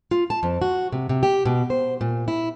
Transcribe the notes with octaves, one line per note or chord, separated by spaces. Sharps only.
F4
A5
F2
F#4
C3
C3
G4
B2
C5
A#2
E4